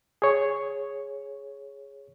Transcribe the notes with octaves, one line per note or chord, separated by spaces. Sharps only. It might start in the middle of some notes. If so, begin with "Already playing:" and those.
G#4 C#5